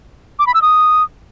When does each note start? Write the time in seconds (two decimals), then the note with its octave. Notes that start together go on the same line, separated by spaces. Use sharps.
0.39 D6
0.47 B5
0.54 E6
0.62 D#6